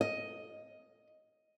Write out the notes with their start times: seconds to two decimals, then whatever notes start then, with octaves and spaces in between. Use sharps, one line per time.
0.01 D#5